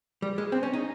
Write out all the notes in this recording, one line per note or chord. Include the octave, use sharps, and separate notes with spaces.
G3
G#3
C4
C#4
D#4